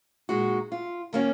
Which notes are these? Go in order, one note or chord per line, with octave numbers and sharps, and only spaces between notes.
A#2 G#3 D#4 F#4
F4
D#3 A#3 C#4 F#4